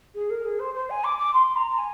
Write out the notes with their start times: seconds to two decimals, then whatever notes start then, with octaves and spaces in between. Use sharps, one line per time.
0.14 G#4
0.30 A#4
0.44 G#4
0.59 C5
0.74 C5
0.90 G#5
1.04 D6
1.18 D6
1.33 C6
1.56 A#5
1.70 A#5
1.78 G#5